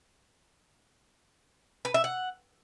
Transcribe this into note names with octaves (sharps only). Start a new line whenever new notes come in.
B4
E5
F#5